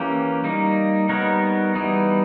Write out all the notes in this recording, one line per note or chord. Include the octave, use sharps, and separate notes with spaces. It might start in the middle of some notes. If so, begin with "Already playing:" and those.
Already playing: E3 A#3 C#4 G4
G3 A#3 D#4
G3 B3 D#4 A#4 C#5
E3 G3 B3 D#4 G#4